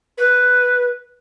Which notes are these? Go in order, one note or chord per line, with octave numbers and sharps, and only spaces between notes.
B4